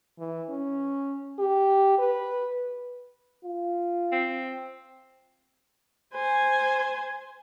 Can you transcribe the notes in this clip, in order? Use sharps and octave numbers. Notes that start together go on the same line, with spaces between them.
E3
C#4
G4
B4
F4
C4
C5 G#5